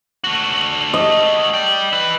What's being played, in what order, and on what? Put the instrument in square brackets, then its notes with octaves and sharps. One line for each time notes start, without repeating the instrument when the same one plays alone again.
[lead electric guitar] A3 F#4
[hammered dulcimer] D#5
[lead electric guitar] D5 G5
E4 B4